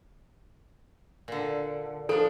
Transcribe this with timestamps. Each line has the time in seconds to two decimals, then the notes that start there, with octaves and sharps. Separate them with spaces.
1.28 A#2 D3
2.09 F3 D4 A4